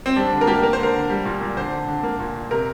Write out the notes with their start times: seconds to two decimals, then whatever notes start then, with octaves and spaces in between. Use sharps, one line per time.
0.06 C4
0.16 G3 D4
0.32 D3
0.41 A#4
0.47 A#3 G4
0.63 A#3 A#4
0.73 C5
0.79 D3 A#4
0.95 D3
1.10 G3
1.25 A#2
1.41 A#2
1.57 D3 C5
1.72 D3
1.88 D3
2.03 A#3
2.20 A#2
2.35 A#2
2.51 C3 A#4